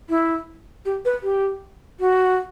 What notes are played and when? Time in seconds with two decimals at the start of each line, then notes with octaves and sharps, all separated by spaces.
0.09 E4
0.85 G4
1.05 B4
1.23 G4
2.00 F#4